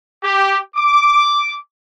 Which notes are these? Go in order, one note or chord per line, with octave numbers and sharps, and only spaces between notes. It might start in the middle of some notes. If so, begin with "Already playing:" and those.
G4
D6